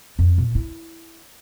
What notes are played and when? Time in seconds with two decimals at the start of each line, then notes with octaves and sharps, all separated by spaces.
0.19 F2
0.38 A#2
0.55 E4